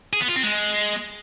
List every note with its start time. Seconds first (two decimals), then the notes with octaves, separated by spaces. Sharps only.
0.13 G#4
0.21 B3
0.28 F4
0.36 C4
0.43 G#3